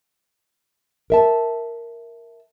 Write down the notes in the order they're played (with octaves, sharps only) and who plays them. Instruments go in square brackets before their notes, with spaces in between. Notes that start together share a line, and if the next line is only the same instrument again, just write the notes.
[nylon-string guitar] A#4 E5 A5